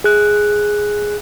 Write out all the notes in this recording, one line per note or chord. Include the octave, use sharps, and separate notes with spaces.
G#4 F#6